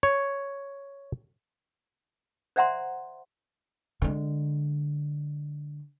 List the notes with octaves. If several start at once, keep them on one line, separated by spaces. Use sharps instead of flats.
C#5
C5 D5 E5 F#5 A#5 C6
D3 G#3